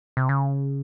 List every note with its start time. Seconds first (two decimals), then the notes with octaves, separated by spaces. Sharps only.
0.17 C3
0.29 C#3